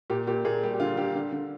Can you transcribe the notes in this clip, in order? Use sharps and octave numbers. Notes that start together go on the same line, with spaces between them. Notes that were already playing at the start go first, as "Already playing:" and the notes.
A#2 G4
A#2 G4
A#2 G#4
G3 G4
G4
D3 F4
D3 G4
D3
D3